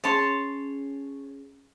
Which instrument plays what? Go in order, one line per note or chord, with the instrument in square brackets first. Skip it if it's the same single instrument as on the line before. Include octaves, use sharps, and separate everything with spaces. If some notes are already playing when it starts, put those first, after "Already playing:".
[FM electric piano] C#4 G#4 [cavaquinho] C#5 A5 C6